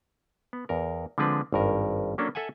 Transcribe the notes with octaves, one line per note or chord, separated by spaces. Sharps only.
B3
E2 A#4
D3 F3 G#3 C4 D4 B4
G#1 G2 A#4
F#3 A#3 C#4 D4 A4
A4 E5 F#5 G#5